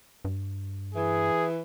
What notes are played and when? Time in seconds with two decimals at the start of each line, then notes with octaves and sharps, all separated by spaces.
0.25 G2
0.95 E3 G#4